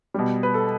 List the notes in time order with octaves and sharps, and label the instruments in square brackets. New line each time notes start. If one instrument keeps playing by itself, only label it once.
[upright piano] B2 G3
B4
A4